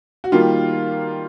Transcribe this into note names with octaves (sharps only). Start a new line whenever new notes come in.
F#4
D#3 G3 A#3 F4